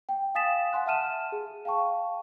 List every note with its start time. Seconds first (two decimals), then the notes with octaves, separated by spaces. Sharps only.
0.09 G5
0.35 F5 G#5 D#6 A6 B6 E7
0.73 F#5 G#5 C6 F#6
0.86 E5 F#5 A5 F6 D#7 E7
1.32 G#4
1.65 F5 G5 A5 C#6